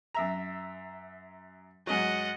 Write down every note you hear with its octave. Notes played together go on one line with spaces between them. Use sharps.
F#2 E5 A#5
G#2 F#3 D#5 F#5